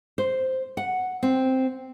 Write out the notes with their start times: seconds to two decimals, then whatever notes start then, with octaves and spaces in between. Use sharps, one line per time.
0.18 C5
0.77 F#5
1.23 C4